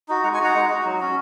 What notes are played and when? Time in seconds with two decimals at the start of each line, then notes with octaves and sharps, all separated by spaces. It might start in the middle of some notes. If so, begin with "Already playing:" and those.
0.08 D#4 F#4
0.24 G#3 F#5 A#5
0.34 G#5 C#6
0.39 D#4 F#4 F#5 A#5
0.55 G#3
0.70 D#4 F#4
0.85 F#3
1.00 C#4 F#4